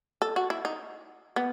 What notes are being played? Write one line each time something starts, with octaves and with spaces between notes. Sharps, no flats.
A4
F#4
E4
D#4
B3